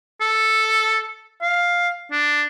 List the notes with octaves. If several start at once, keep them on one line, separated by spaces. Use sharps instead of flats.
A4
F5
D4